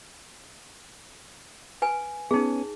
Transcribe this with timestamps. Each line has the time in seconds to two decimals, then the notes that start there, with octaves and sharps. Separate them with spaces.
1.82 B4 G#5
2.31 B3 C#4 D#4 G#4